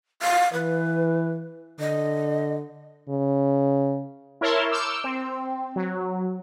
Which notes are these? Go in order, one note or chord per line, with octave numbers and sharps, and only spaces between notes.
F5
E3 B4
D3 D#5
C#3
E4 A#4 C#5 E5 A5 C6
D6 E6 F6 G6 C#7
C4
F#3